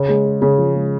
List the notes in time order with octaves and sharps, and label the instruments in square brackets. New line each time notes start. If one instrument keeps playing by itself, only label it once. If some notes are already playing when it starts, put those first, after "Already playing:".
Already playing: [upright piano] C#3
[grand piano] G#3
G#4
[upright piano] C#3 [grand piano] G#4
[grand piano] F3
G#3